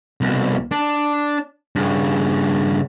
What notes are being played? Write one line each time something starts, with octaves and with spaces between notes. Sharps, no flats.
C2 B2
D4
G2 C#3